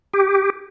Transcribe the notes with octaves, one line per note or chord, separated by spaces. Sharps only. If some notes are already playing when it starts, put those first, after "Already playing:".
G4